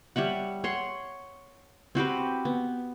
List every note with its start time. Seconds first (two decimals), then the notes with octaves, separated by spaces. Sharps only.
0.16 G3 C#5 E5 F#5
0.64 C#5 F#5 C6
1.95 C4 F#4 G4 B4
2.45 B3